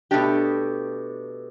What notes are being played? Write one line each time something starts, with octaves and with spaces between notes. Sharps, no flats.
B2 A3 D4 G4